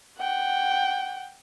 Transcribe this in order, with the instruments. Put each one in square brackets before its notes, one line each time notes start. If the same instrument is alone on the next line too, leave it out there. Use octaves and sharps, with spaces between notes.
[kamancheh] F#5 G5